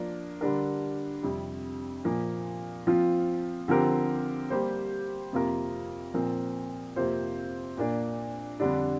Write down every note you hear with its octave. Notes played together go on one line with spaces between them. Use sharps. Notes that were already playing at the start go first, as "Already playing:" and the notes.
Already playing: F3 A#3 D4 A#4
D3 G3 D4 A#4
F2 C3 G3
A#2 F3 A#3
F3 C4 F4
D3 F3 C4 G4 A#4
G3 A#3 G4 C5
F2 C3 A#3 F4 A#4
A#2 F3 C4 A#4
F2 C3 A#3 F4 C5
A#2 A#3 D4
F2 D3 G3 D4